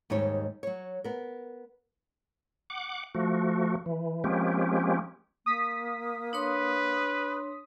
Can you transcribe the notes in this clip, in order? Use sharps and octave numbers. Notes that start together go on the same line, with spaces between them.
D#2 G#2 G3 D#4 C#5
F#3 C#5
B3 A#4
F#5 D6
F3 A3 F#4
E3
F3 G#3 A#3 C4 C#4 G4
A#3 D#6 B6
D4 B4 C#5 C6